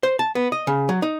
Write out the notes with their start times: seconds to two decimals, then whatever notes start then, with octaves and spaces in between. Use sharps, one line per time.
0.03 C5
0.19 A5
0.35 B3
0.52 D#5
0.67 C#3
0.89 F#3
1.02 D#4